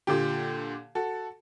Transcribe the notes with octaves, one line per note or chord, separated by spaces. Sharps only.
A#2 D3 G4
F#4 A4